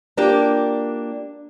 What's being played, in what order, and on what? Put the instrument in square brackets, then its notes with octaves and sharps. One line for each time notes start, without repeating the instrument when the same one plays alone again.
[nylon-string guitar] A#3 D4 F4 G4